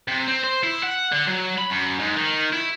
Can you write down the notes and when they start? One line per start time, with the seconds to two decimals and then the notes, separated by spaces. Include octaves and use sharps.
0.08 C3
0.28 C4
0.44 C5
0.63 E4
0.83 F#5
1.13 D3
1.28 F#3
1.58 B5
1.70 F#2
2.00 G#2
2.17 D#3
2.53 E4